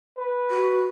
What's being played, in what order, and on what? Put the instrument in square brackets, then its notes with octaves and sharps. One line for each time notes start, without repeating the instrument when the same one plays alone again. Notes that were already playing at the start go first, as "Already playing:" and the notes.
[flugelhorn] B4
[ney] F#4